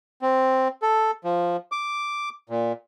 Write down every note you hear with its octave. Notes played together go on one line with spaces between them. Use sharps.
C4
A4
F3
D6
A#2